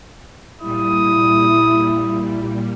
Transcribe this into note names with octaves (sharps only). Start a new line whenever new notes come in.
A#2 G3 E4 D#6